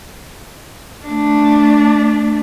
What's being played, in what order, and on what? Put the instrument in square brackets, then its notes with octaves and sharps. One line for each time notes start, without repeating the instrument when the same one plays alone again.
[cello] A3 D4